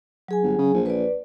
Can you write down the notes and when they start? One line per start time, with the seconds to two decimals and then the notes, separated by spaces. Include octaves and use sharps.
0.28 F#3 G#4 G#5
0.43 G1
0.59 C#3
0.74 A#1
0.86 B4 D5